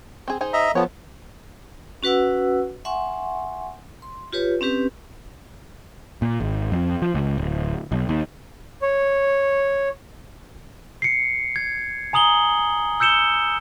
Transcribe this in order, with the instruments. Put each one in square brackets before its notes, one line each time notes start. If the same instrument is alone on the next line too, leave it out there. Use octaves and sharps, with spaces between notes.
[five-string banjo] C4 G#4
D#4 G#4 C5
[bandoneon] D#5 E5 A#5
[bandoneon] F3 B3 [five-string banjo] A4 A#4 C#5
[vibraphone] C#4 F#4 B4 F#5 E6
E5 F#5 G#5 C6 C#6
C6
F4 G4 B4 C#5
C4 C#4 G4 B4
[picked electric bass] A#2
G#1
F2
F3
C#2
D1
B1
D#2
[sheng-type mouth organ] C#5
[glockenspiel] C7 C#7
G#6
G#5 A#5 D#6 F#7 G7
E6 G6 C#7 E7 G7